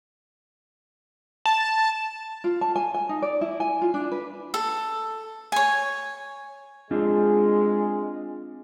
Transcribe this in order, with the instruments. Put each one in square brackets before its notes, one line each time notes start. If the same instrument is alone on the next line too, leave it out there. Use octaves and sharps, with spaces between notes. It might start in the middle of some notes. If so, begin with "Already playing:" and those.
[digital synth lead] A5
[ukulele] F4
A5
G#5
G#5
D#4
D5
E4
G#5
F4
D4
B4
[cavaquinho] A4
C#5 G#5
[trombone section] G#3 [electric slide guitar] C4 D4 F4